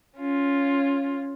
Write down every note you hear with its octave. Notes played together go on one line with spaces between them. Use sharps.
C#4 F4